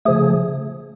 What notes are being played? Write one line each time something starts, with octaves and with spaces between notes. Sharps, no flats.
C#3 F3 A3 G#4